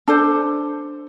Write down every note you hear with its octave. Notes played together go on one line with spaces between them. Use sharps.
D4 A4 C5